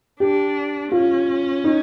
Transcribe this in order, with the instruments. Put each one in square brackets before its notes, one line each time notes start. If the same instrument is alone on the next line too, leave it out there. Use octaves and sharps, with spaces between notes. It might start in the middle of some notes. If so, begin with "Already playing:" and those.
[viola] D4 [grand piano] G4
[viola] C#4 [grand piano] F4
[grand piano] D#4